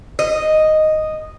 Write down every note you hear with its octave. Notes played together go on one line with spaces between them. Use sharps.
D#5